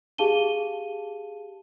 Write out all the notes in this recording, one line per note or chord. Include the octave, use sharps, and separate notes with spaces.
G4 G#4 F5 A5 D#7 G7